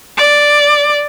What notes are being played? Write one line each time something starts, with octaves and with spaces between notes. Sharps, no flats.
D5